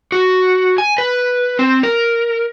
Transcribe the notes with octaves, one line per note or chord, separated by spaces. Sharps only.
F#4
G#5
B4
C4
A#4